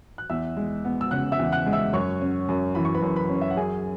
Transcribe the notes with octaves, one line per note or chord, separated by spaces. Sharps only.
F#6
E2 E5 E6
G#3
B3
E6
C#3 F#5 F#6
E5 E6
E2
F#5 F#6
G#3
E5 E6
F#2 C#5 C#6
C#4
F#2
E3 B5
C#6
B4 B5
F#2
B4 B5
C#4 C#5
E5
F#5
F#2 G#4 G#5